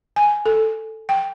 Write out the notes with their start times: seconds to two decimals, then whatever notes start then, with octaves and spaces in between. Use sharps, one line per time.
0.16 G#5
0.46 A4
1.09 G5